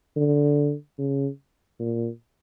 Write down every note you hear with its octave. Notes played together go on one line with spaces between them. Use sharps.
D3
C#3
A#2